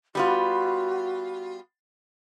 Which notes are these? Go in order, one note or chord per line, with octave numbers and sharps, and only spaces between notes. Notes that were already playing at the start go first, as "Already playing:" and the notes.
G3 B3 F4 F#4